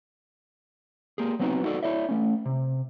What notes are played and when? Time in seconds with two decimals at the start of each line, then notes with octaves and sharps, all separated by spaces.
1.18 A#3 G4 G#4
1.39 F#3 B3 C4 D#4 F#4
1.64 D#4 F#4 A4 D5
1.83 E4 C#5 D5 E5
2.09 A3 C#4
2.45 C3